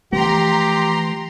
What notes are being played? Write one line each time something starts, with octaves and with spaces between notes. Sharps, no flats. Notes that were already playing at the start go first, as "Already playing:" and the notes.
E3 F3 A3 G4 A#5 C6